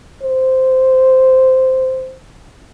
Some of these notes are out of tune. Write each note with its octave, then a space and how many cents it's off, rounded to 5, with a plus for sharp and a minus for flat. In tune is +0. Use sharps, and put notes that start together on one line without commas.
C5 -10